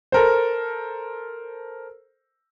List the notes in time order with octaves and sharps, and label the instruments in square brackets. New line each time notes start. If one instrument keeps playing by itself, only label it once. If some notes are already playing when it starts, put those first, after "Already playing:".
[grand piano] A4 A#4 C5